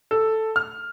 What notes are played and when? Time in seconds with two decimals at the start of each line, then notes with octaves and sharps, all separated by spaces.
0.11 A4
0.56 F6